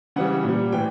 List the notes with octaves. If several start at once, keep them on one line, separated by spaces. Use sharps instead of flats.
C#3 E3 G3 F#5
A#2 G3
A2 E3 G5